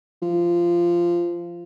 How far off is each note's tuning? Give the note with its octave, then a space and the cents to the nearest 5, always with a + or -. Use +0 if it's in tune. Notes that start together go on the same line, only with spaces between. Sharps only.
F3 -15